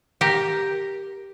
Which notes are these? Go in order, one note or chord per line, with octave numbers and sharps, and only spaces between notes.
G4 A#4